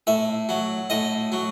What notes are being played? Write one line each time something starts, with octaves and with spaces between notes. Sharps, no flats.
A2 E5
F#3
A2 D#5
F#3